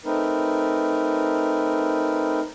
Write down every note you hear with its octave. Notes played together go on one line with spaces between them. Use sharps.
A3 C4 D#4 A#4 B4